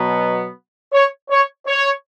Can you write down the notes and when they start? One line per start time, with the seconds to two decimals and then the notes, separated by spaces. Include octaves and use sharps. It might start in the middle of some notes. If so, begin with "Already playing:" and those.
Already playing: B2 F#3 B3
0.93 C#5
1.30 C#5
1.67 C#5